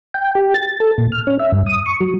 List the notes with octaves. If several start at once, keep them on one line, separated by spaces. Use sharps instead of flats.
G5
G4
A6
A4
A#2
F6
C#4
E5
G2
D#6
C#6
F#3